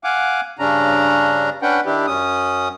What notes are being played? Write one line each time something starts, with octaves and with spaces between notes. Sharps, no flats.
F5 F#5 G#5 D6
G2 C#3 C#4 D4 A#5
C#4 D4 B4 F#5 G5
D#3 D4 E4 G4
F#2 C#4 D#6